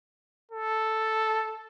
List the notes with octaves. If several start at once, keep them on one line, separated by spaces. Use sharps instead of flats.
A4